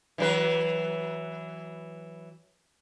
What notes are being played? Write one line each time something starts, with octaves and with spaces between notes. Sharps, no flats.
E3 F#3 B4